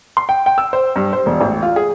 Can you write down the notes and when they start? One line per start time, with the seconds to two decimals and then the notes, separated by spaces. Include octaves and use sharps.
0.17 C6
0.29 G5
0.46 G5
0.58 E6
0.73 C5
0.96 G2
1.13 C5
1.26 E1
1.41 A1
1.63 F4
1.76 G#4